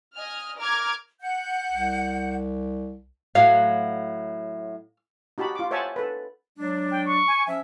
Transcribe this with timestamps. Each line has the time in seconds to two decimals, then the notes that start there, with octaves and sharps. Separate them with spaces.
0.16 D#5 G#5 F6
0.58 A#4 D6 F6 G#6
1.21 F#5 G6
1.71 C2
3.35 A2 F#3 F5
5.38 D#4 F#4 G4 A5 B5
5.55 F4 D6
5.71 C5 C#5 E5 F#5 G#5 A5
5.96 A4 B4
6.58 F#3 G#3 D4
6.91 G5
7.05 C#6
7.28 G#5
7.48 F3 C#4 E5